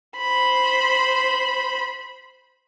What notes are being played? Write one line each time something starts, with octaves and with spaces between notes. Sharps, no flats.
C5 B5